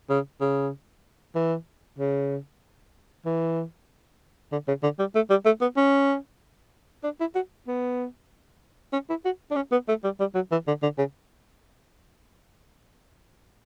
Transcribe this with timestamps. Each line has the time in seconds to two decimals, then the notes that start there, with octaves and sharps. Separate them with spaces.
0.10 C#3
0.41 C#3
1.35 E3
1.99 C#3
3.25 E3
4.52 D3
4.68 C#3
4.83 D3
4.99 G3
5.15 A3
5.30 G3
5.46 A3
5.61 B3
5.77 C#4
7.04 D4
7.20 E4
7.35 F#4
7.67 B3
8.93 C#4
9.10 E4
9.25 F#4
9.51 D4
9.56 C#4
9.72 B3
9.88 A3
10.04 G3
10.20 G3
10.35 F#3
10.52 E3
10.68 D3
10.83 D3
10.98 C#3